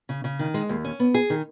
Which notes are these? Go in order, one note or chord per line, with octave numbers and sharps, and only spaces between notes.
C#3
C#3
D#3
G#3
D#2
C#4
B3
G#4
D#3